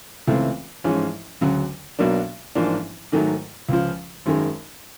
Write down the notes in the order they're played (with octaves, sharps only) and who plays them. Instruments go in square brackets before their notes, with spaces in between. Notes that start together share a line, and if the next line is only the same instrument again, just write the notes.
[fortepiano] C#2 C3 E3 A3 C4
A1 G#2 F3 G#3 C#4
D2 C#3 F#3
B1 B2 F#3 A#3 D4
A1 G#2 F3 A#3 D4
G#2 D#3 F#3 A3
C#2 C#3 F3
G#1 F#2 D#3 G#3